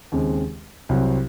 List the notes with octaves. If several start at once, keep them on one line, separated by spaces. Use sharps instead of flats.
D#2 C#3 G#3 C4
C2 C3 F#3 C4